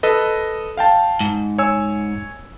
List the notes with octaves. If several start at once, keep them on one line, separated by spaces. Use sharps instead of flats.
A4 B4 D#5
F5 G5 A5
G#2
C#5 G#5 E6